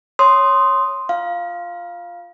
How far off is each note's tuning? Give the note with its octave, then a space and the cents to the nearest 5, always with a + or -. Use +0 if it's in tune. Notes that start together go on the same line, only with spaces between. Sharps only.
C#5 +0 C6 +0 D#6 +0
F4 +0 F5 +0